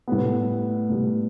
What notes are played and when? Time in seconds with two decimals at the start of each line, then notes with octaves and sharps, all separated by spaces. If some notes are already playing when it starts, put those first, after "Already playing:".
0.08 A2 G3 B3
0.90 A2 G3 B3